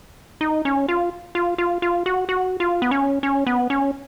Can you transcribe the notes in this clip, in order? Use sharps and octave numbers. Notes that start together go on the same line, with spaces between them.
D#4
C#4
F4
F4
F4
F4
F#4
F#4
F4
B3
C#4
C#4
B3
C#4